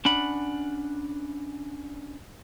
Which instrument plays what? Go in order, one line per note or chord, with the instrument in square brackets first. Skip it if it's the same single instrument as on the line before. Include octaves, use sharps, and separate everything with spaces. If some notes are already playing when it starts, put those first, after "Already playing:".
[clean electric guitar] C#4 D4 F#5 B5